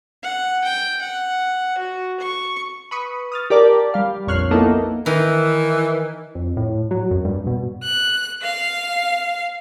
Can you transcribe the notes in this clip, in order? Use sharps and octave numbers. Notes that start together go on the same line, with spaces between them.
F#5
G5
F#5
F#4
C#6
B4 B5 C#6 D#6
D#6 F6 A6
G4 A#4 D5 A5
G3 F5
A#1 F2 C#5 F6 F#6 C7
A#3 B3 D#4 E4 A4
D#3 E3
F2
A2
F#3
F#2
G2
B2
F#6
F5